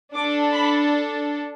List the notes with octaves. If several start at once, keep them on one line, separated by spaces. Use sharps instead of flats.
D4 A4 D6
B5